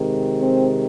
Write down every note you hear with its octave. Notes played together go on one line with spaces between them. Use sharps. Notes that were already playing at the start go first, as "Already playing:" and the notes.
Already playing: C3 D#3 G#3
C4